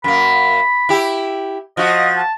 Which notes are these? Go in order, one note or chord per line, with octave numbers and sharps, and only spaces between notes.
F#2 A#3 B5
E4 G4
F3 F#4 D#5
A5